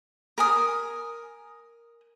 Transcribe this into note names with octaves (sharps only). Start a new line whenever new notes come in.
A#4 G#5 D#6